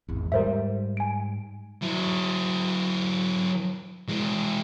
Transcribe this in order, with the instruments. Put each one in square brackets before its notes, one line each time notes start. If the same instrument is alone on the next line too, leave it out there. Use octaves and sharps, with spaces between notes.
[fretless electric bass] G#1 E2
[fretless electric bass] G#2 G3 [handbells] A#4 C5 E5
[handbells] G#5 D7
[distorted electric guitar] F#3 E4
E3 G#3